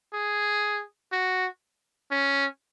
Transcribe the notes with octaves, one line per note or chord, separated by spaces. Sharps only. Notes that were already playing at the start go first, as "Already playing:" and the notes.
G#4
F#4
C#4